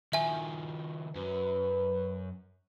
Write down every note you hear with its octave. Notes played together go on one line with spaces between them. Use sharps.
D#3 F3 E5 G#5
F#2 B4